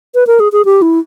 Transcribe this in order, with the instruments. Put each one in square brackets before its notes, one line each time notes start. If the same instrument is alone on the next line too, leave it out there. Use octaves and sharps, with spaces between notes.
[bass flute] B4
A#4
G#4
G#4
G4
E4